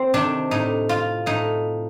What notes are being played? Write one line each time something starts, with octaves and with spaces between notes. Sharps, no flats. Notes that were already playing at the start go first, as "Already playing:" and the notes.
Already playing: C4
C3 D#3 D4
A2 D#4
F4
A2 D#4